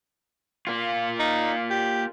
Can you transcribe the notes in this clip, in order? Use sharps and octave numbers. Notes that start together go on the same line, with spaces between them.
A#3 F4
D#4
G4